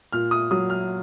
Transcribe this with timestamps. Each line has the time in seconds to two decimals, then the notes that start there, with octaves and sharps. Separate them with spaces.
0.12 A#2 F6
0.31 D#6
0.51 F#3 D#6
0.70 F6